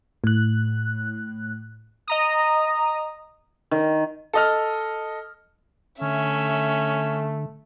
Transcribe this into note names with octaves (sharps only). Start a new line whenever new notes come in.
A2 F#6
D#5 A#5 D#6
D#3
A4 D#5 F6
D3 A3 C#4 E5